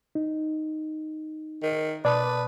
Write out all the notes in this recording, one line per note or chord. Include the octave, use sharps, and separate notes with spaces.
D#4
D#3
B2 B4 D5 A5 D#6